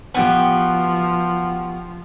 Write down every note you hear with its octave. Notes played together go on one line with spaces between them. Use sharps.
F3 B3 F#4 G4